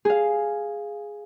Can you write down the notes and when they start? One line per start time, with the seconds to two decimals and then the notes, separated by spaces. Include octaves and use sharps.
0.05 G#4 F5